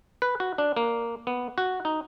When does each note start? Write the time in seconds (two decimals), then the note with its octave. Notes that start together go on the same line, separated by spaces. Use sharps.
0.22 B4
0.40 F#4
0.58 D4
0.77 A#3
1.27 B3
1.58 F#4
1.85 D#4